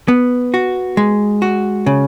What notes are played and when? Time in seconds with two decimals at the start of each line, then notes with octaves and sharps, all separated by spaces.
0.08 B3
0.54 F#4
0.97 G#3
1.42 F#4
1.86 C#3